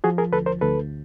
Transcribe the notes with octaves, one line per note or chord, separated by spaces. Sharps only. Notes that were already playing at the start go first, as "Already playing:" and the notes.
F3 F#4 G#4
G#4 A#4
D2 A4 B4
A#4 C5
D2 A4 B4